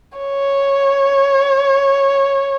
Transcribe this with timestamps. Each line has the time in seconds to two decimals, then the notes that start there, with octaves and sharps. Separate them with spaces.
0.18 C#5